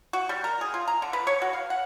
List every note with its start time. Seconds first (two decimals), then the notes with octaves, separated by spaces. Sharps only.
0.13 F#4
0.29 G3
0.44 A#4
0.61 G#4
0.74 F4
0.88 A#5
1.02 D3
1.13 B4
1.27 C#5
1.42 F#4
1.53 F5
1.70 F#5